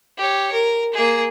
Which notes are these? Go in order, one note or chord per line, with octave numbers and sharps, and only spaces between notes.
G4 C#5
A#4
A#3 G#4